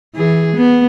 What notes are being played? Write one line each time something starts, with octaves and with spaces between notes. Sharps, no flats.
E3 G#4
B3